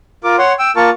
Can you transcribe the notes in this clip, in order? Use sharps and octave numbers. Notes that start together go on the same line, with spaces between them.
F4 A#4 D6
C#5 F#5 C6
G5 E6
A#3 F4 A#4 A5 C#6